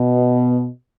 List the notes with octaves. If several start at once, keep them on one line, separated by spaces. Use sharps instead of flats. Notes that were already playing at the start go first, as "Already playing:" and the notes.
Already playing: B2